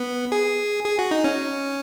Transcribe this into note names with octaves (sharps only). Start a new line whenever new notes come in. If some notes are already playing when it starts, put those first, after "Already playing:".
Already playing: B3
G#4
G#4
F#4
D#4
C#4